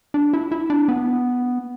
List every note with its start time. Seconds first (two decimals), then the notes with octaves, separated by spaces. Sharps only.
0.14 D4
0.33 E4
0.52 E4
0.70 D4
0.88 B3